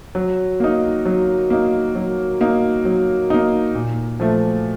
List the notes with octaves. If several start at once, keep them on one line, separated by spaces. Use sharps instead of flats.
F#3
A#3 D#4
F#3
A#3 D#4
F#3
A#3 D#4
F#3
A#3 D#4
A#2
F3 A3